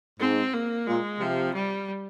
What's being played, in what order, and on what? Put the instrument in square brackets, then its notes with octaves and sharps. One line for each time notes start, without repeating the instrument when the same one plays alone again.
[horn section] G#2 [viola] C4
[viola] A#3
[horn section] A#2 [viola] G#3
[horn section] C3 [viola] F3
[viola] G3